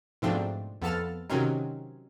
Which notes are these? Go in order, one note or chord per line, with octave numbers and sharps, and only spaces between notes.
G#2 B2 F3 A3 C4 D4
F2 B3 A4 A5 F6
C3 D#3 F#3 C4 C#4 D#4